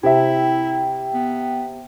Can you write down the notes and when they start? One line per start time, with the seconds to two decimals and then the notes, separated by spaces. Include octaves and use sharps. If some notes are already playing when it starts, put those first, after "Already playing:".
0.03 C3 E4 E5 G5
1.14 B3